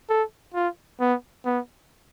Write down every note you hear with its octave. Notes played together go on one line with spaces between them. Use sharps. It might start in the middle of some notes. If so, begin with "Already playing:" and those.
A4
F4
B3
B3